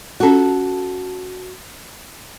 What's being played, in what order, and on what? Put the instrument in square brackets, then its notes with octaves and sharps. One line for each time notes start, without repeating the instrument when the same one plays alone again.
[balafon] C#4 F4 [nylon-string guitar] F#4 A4